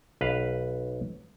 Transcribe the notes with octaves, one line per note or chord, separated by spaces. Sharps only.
B1 B4 F5